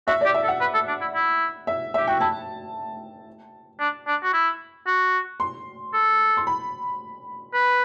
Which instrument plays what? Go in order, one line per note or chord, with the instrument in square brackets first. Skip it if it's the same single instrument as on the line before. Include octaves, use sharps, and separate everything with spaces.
[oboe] F#4 [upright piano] E5
[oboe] G4 [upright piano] D5
[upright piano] E5
[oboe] A4
[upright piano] F#5
[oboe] B4
A4
D4
E4
E4
[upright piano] E5
[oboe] G4 [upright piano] E5
[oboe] F#4 [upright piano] G5
[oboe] E4 [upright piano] A5
[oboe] D4
D4
F#4
E4
F#4
[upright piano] C6
[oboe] A4
[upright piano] C6
B5
[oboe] B4